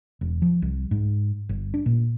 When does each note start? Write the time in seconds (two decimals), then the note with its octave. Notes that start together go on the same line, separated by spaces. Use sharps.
0.21 E1
0.42 F3
0.62 C2
0.91 G#2
1.49 G1
1.74 D4
1.86 A#2